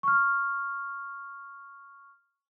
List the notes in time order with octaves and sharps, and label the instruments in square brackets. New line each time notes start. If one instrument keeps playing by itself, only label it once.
[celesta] C#6 F6